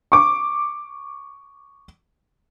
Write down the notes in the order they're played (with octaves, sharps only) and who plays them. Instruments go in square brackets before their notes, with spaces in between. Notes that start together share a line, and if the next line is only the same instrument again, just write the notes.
[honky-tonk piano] C#6 D6